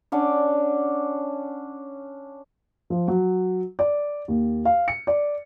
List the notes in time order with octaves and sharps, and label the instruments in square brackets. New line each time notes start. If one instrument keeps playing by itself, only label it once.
[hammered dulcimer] C#4 D4 F#5 D6
[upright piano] F3
F#3
D5
D#2
F5
C#7
D5